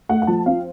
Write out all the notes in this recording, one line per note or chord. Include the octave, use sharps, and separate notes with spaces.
A3 F#5
F#5
F3 A5
C4 F5